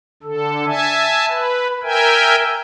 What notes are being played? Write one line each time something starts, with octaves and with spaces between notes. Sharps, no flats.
D3 A4
E5 G#5 A5
B4
A#4 E5 G5 G#5